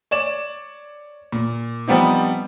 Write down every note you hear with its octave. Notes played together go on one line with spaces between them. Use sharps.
C#5 D5 E7
A#2
F3 G3 B3 C4 D#4